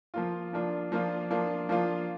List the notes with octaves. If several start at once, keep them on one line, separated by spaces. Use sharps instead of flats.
F3 A#3 F4
F3 A#3 D4 F4
F3 A#3 D4 F4
F3 A#3 D4 F4
F3 A#3 D4 F4